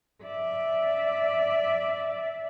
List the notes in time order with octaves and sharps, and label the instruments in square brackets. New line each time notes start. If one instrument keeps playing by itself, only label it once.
[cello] D5 E5